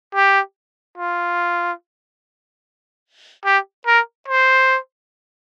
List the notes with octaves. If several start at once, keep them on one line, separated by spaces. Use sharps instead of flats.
G4
F4
G4
A#4
C5